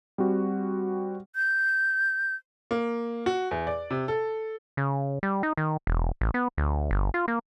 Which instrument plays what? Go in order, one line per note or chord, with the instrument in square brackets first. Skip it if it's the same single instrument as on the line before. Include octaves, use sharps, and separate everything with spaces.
[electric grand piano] G3 C4 F#4
[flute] G6
[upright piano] A#3
F#4
E2
D5
C3
A4
[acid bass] C#3
G3
D#4
D#3
E1
A1
B3
D2
G1
F4
A#3